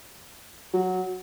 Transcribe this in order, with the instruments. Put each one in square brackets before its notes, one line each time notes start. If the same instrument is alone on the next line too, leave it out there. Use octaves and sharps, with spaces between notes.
[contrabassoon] F#3